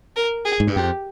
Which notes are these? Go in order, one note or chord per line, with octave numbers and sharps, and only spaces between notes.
A#4
G#4
G#2
G2
F2 G4